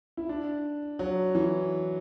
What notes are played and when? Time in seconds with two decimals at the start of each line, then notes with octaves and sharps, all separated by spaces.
0.17 E4
0.29 D4
0.99 F#3
1.35 E3